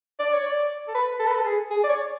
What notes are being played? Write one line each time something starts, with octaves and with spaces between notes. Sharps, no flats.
D5
C#5
D5
A4
B4
A4
B4
A4
G#4
G#4
D5
C#5